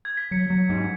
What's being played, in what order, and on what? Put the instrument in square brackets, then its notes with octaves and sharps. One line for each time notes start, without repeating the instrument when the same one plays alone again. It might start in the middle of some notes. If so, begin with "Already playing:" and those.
[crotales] G#6
B6
[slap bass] F#3 [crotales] C#7
[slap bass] F#3
G#2